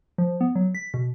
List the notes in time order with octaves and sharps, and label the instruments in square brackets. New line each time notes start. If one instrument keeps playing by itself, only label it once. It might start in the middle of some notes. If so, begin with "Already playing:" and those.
[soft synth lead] F3
B3
F#3
B6
B2